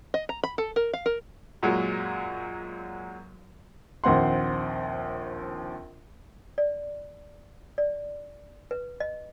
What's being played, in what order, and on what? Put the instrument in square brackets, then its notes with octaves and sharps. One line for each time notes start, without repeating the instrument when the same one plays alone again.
[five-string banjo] D#5
A#5
B5
A4
A#4
F5
A#4
[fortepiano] F#2 A#2 F#3 G#3
[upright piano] A#1 D#2 C4 F#5 C6
[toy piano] D5
D5
B4
D#5